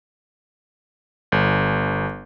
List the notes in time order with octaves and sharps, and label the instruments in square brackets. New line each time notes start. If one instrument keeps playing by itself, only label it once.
[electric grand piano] G1